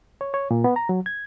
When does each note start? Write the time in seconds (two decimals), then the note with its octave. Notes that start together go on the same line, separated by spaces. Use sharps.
0.21 C#5
0.34 C#5
0.51 A#2
0.64 B3
0.76 A#5
0.89 F#3
1.06 G#6